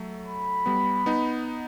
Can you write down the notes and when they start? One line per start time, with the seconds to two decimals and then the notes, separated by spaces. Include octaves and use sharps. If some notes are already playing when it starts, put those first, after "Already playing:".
Already playing: F#3 A3
0.26 B5
0.66 G3 B3
1.06 B3 D#4